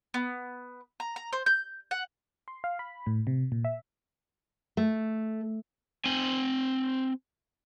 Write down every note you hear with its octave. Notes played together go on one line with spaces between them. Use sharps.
B3
A#5
A#5
C5
G6
F#5
C6
F5
B5
A2
C3
A#2
E5
A3
C4 G#5